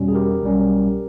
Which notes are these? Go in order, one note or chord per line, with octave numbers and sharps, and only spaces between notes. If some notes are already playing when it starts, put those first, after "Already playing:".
Already playing: E2 B2 G3 C#4
G#4
G4 A#4
B1 B2 G3 C#4